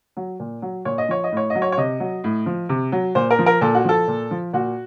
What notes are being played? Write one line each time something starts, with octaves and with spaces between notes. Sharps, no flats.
F#3
A#2
F#3
A#2 C#5
D#5
F3 C#5
D#5
A2 C#5
D#5
F#3
C#5
C#5
C3 D#5
F#3
A2
F3
C3
F#3
A#2 C5
A#4
F3
A#4
A#2 A4
F#4
F3 A4
A#2
F3
A#2 F#4